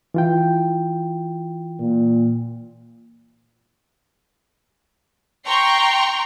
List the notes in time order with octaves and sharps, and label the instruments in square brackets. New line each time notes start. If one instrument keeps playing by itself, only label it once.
[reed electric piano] E3 F4 G5
[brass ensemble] A#2
[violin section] G5 A#5 C6 C#6